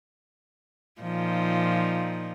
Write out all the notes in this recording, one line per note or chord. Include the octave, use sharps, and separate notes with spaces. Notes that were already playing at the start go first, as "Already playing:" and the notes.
A#2 F3 D#4